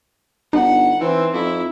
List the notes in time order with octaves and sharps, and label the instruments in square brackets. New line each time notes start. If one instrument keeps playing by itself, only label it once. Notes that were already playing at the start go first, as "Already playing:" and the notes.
[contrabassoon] G1 [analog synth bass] D#4 [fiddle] F#5
[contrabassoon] E3 [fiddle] C4
[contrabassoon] F2 [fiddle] E4